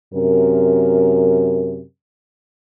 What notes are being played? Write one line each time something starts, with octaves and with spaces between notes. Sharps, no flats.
F#2 C3 A#4